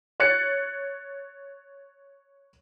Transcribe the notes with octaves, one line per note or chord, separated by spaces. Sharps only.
C#5 F#6 A6 C#7